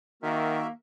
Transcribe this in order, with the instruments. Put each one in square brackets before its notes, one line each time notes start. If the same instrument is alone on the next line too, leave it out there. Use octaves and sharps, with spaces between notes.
[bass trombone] D#3 [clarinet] A#3 [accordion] F#4 A#4 E5